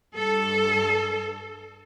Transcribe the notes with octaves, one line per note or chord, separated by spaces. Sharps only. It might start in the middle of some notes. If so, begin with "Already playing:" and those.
G2 A4